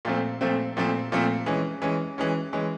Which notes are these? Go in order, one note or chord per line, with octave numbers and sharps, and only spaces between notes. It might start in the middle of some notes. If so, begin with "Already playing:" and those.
A#2 F3 A3 C4
A#2 F3 A3 C4
A#2 F3 A3 C4
A#2 F3 A3 C4
E3 G#3 C#4
E3 G#3 C#4
E3 G#3 C#4
E3 G#3 C#4